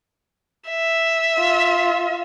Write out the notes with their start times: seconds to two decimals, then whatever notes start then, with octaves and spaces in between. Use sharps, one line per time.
0.70 E5
1.38 F4